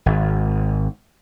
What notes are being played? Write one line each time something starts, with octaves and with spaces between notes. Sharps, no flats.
G#1